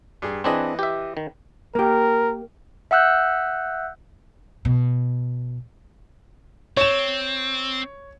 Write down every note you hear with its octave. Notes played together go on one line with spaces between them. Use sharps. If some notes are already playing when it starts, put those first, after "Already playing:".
G2 G#4
E3 C4 D4 G#4 B4 D#5
G4 E5
D#3
A#3 G4 A#4
E5 F#5 E6 F#6 G6
B2
C4 C#5 E7